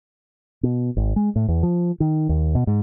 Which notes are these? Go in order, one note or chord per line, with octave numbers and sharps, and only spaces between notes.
B2
G#1
G#3
A2
E2
F3
D#3
D#2
B2
G#2